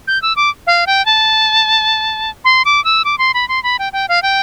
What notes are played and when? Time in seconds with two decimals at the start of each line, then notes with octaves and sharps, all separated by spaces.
0.08 G6
0.22 E6
0.36 D6
0.67 F5
0.87 G5
1.06 A5
2.45 C6
2.65 D6
2.85 E6
3.05 D6
3.18 C6
3.34 B5
3.49 C6
3.63 B5
3.79 G5
3.93 G5
4.09 F5
4.23 G5